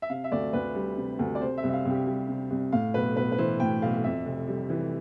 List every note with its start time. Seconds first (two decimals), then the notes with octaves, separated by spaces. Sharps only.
0.02 E5
0.10 C3 F5
0.24 E5
0.32 D2 D5
0.53 D2 B4
0.75 G3
0.97 C3
1.19 D2
1.35 D5
1.41 C3 C5
1.58 E5
1.63 C2
1.69 E5
1.73 F5
1.85 C2
1.90 G4
2.06 G3 G4
2.29 C3
2.50 C2
2.72 A2 F5
2.94 B1 B4
3.16 B1 B4
3.32 B4
3.38 E3 C5
3.60 A2 G5
3.82 B1 F5
4.04 F2 E5
4.26 F1
4.48 G3
4.70 E3